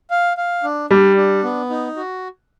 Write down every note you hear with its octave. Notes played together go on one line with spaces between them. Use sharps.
F5
F5
D4
G3 D4
D4
B3
D#4
F#4